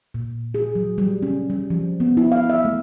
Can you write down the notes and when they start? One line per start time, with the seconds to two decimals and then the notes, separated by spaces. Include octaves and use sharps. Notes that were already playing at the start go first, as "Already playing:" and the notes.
0.14 A#2
0.54 G#4
0.75 F#3
0.98 G3
1.22 C#4
1.50 G3
1.70 F3
2.00 B3
2.17 E4
2.32 F5
2.50 E5
2.65 A3